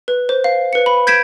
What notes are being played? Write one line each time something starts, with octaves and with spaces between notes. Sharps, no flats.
B4
C5
F5
B4 C#7
B5
G6 G#6 B6 D7 E7